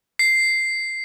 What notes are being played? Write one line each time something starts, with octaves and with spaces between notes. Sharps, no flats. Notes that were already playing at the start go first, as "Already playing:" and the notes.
C7